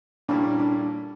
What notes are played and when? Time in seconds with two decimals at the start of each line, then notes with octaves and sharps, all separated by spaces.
0.28 A#2 G3 A#3 C#4 D4 E4
0.60 D4